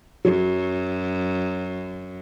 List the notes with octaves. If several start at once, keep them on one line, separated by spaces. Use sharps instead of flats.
F#2 F#3